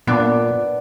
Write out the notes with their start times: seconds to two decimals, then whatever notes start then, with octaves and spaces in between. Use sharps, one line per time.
0.07 A#2 B3 D4